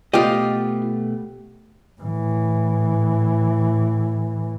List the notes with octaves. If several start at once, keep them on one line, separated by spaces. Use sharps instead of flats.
B2 A3 B3 F4 G4 D#5
A2 E3